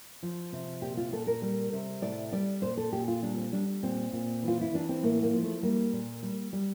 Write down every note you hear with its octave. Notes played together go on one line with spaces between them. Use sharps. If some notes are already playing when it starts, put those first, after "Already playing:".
F3
C3
A#2 G4
F4
A#2 A4
A#4
G3
C3
A2 D5
G3 D5
A#2 C5
A4
A#2 G4
F4
G3 D4
C4
G3 D4
A#2 C4
A#2
E3
F4
E4
E3 D4
C4
A2 A#3
A#3
F3
A3
G3 A#3
A#2
G3
G3